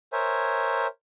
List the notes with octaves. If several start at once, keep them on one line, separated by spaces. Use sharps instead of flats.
A#4 C5 C#5 E5 G#5